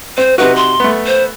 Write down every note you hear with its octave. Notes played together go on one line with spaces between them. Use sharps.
C4 C5
C3 D#4 F#4 B4
C6
A3 B3
C5